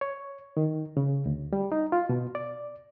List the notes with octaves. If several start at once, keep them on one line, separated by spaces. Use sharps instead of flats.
C#5
D#3
C#3
D2
G3
D#4
F4
B2
D5